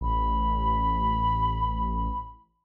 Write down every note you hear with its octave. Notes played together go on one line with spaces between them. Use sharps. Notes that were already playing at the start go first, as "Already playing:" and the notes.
A1 B5